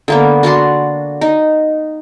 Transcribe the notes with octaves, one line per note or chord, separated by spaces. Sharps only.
D3 A#3 B3
D4 F#4 D5 C6
D#4